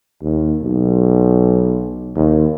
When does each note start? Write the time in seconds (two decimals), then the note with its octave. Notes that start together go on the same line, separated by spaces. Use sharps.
0.22 D#2
0.62 B1
2.16 D#2